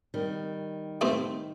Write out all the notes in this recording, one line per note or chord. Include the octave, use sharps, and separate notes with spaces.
D#3 G3
A2 A3 C4 G4